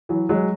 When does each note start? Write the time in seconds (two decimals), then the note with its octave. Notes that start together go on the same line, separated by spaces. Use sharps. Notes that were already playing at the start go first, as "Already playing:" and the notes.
0.09 E3 F#3
0.29 F#3 G#3